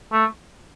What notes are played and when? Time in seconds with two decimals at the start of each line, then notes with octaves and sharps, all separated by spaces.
0.13 A3